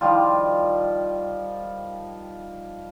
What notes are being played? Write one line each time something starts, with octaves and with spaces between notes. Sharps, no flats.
D#3 F3 G3 F4